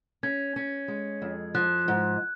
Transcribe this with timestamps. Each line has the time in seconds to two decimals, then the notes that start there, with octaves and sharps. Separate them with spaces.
0.23 C#4 G#6
0.56 C#4
0.88 G#3
1.22 F2
1.54 F3 F#6
1.88 G#2